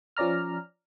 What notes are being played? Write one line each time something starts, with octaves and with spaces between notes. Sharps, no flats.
F3 C#4 D5 A#5 F6